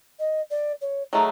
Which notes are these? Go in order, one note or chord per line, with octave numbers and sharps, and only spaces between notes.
D#5
D5
C#5
D#3 F#3 A3 G#4